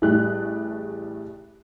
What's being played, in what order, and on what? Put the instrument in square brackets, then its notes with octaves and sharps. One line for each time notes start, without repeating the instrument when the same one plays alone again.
[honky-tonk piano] A1 G3 A3 G#4 F#6